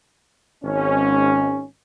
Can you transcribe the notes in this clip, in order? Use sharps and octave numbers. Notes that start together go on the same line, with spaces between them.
G#1 G#2 C#4